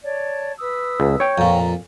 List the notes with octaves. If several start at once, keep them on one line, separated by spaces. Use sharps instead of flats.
C#5 D5 A5
B4 D#6 E6
C#2
C#5 G5
F2 A#2 A#5